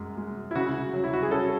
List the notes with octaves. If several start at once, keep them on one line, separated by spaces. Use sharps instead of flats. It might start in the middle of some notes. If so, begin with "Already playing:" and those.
Already playing: F#2 G#3
G#3
E4
C#3 F#4
F#3
E4
F#4
G#4
C#4 A4